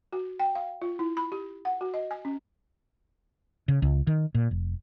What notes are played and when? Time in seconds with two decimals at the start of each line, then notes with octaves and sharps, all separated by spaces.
0.13 F#4
0.40 G5
0.55 F5
0.82 F4
0.99 E4
1.17 B5
1.32 G4
1.65 F#5
1.81 F#4
1.94 D#5
2.11 G#5
2.25 C#4
3.68 C#3
3.82 C#2
4.07 D#3
4.35 A#2
4.51 F1